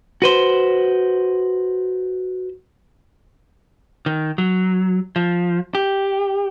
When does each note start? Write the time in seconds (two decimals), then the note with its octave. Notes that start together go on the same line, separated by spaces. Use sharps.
0.22 F#4 B4 C5
4.06 D#3
4.38 F#3
5.16 F3
5.75 G4